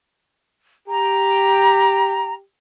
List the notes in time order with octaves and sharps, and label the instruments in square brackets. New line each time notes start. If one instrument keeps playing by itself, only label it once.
[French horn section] G4 [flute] A#5